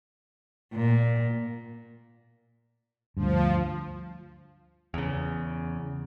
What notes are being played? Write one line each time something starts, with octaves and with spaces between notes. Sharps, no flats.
A#2
D2 G2 F3
E2 C#3